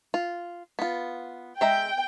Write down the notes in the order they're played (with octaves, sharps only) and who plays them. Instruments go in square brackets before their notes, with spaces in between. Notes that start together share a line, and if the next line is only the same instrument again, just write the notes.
[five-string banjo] F4
B3 F4
[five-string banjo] G#3 E5 A#5 [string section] G5